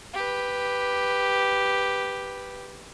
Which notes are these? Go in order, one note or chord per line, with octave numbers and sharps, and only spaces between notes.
G4 B4